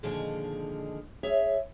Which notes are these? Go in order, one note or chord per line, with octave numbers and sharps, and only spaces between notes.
A#2 D3 D#3 F3 G#3 G#4
G#4 C#5 E5